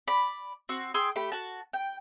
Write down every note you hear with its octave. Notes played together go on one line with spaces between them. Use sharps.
D5 B5
C4 F#4
G#4 G5 C6 E6
A3 G4 B5
F#4 A5
G5